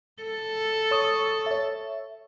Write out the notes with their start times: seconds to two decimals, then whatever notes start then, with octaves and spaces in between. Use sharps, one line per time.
0.23 A4
0.91 C#5 C#6 D#6
1.46 C#5 E5